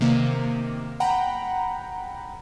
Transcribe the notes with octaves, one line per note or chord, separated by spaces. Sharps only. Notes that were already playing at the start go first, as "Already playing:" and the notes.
C3 D#3 A#3
F#5 G5 A#5 B5